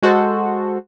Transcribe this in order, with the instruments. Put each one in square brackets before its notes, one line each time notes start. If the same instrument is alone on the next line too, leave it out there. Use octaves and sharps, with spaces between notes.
[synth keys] G#3 F#4 A4 C5